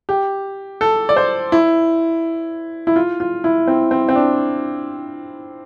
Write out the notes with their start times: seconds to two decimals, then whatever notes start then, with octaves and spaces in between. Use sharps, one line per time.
0.09 G4
0.81 A4
1.09 D5
1.16 C5
1.52 E4
2.87 E4
2.96 F4
3.20 F4
3.44 E4
3.67 C4
3.91 C4
4.09 C4
4.15 D4